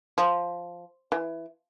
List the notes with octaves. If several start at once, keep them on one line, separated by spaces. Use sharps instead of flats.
F3
E3